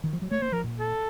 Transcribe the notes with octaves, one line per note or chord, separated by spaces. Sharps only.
D#3
F3
F#3
A3 C#5
A#3 C5
F3 A#4
A#2
A4